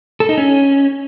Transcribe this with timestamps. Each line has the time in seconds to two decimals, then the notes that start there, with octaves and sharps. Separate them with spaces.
0.20 A4
0.29 D#4
0.38 C#4